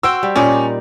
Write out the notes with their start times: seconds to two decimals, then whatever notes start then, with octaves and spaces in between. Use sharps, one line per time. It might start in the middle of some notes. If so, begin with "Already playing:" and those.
0.03 F#4 C5 G5 E6
0.23 G3
0.36 A#2 C#4 D#4 D5